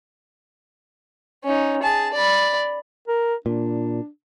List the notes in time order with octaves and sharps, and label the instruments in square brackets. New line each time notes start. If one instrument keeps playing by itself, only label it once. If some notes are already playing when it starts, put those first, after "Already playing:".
[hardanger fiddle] C#4 D#4
G#4 A5
D5 B5
[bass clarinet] A#4
[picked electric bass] A#2 [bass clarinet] D4